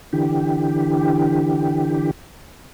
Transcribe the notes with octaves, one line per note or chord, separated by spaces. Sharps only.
D3 E3 G4